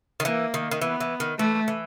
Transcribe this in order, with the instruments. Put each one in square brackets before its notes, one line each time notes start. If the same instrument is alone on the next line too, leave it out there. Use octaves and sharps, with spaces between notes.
[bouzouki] D#3
[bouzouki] E3 [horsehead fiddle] A#3
[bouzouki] D#3
D#3
[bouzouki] E3 [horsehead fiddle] B3
[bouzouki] E3
D#3
[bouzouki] E3 [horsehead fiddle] A3
[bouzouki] E3